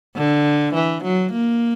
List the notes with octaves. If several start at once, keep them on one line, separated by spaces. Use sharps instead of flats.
D3
E3
F#3
A#3